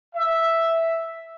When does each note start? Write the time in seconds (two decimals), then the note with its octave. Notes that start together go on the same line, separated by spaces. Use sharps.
0.14 E5